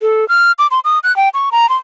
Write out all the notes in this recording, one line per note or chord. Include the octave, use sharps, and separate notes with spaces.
A4
F6
D6
C6
D#6
F#6
G5
C#6
A#5
C6